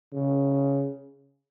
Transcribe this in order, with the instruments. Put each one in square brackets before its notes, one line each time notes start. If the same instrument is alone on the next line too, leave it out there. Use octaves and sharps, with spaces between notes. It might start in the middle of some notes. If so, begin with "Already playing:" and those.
[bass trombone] C#3